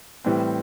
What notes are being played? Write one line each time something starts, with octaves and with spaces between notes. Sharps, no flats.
A2 E3 G3 C4